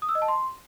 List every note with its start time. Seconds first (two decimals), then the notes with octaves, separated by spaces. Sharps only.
0.02 D#6
0.09 E6
0.15 D#5
0.22 A5
0.28 C6